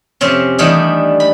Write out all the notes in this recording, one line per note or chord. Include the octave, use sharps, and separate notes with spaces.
F2 C3 C4 C#4
D#3 E3 G3 A3 B3 D4
B5